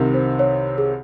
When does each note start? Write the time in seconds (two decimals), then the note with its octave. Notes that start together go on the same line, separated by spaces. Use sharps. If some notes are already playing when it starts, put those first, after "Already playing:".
Already playing: C2 C3 D#3 A#4
0.14 C5
0.39 C#5
0.78 G#4